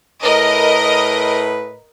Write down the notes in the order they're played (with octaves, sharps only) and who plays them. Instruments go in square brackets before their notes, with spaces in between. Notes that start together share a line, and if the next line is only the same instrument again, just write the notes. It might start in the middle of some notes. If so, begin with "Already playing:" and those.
[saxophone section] A2 B4 [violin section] A#4 D#5